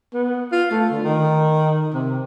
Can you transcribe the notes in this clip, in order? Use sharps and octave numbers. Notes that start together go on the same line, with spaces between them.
B3
F4
A3
D3
D#3
C3